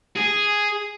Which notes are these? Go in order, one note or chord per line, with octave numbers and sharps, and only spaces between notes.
G#4